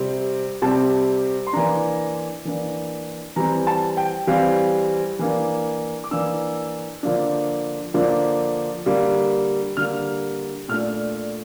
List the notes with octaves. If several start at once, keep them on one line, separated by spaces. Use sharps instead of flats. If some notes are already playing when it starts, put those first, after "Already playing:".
Already playing: C3 G3 C4
C3 G3 C4 A5
C6
E3 A#3 D4 A#5
E3 A#3 D4
E3 G3 C4 A#5
A5
G5
E3 G3 C4 F5
E3 A#3 D4
D6
E3 A#3 D4 E6
D3 F3 A#3 D4
D3 F3 A#3 D4
D3 G3 A#3
D3 G3 A#3 F6
A#2 A3 D4 F6